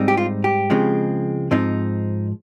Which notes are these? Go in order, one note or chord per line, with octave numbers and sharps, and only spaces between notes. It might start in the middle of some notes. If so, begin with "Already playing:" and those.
Already playing: G#2 G3 C4 D#4
G4
F4
G4
C#2 C#3 F3 G#3 C4
G#2 F3 C4 D#4